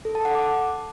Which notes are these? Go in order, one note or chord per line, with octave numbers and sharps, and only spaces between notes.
A4
A5
F#5
D6